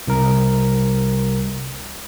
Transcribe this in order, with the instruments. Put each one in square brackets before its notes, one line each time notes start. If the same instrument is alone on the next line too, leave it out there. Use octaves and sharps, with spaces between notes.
[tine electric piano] C2 A#4